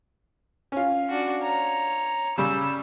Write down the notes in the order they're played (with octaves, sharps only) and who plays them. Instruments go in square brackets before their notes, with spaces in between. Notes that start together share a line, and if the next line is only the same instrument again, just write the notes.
[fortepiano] C#4 F4
[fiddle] D4 F#4
C#5 A#5
[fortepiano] C#3 G3 [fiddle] E6